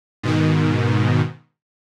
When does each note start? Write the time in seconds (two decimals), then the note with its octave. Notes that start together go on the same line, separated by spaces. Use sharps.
0.23 G#2 B2 D#3